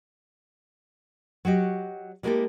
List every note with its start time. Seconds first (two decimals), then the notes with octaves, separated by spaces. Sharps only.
1.45 F#3 F#4 G4 D#5
2.23 G3 G#3 A#3 E4 G4 A4